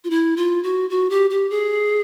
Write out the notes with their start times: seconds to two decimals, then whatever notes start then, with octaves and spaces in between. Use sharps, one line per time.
0.04 F4
0.10 E4
0.37 F4
0.63 F#4
0.90 F#4
1.10 G4
1.30 G4
1.50 G#4